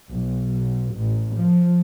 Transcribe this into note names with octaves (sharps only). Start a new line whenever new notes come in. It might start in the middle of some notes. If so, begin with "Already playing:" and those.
B1
A1
F3